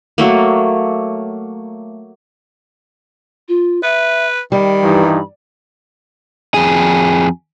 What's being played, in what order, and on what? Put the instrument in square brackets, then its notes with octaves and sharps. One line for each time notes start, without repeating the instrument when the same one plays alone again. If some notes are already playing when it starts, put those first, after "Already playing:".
[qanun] F#3 A3 A#3
[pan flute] F4
[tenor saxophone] B4 [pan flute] E5
[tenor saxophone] D#3 [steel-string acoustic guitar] G3 [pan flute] B5
[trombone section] G2 E3 D#4
[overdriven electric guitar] F2 G#4